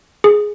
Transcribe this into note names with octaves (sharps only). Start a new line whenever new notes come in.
G#4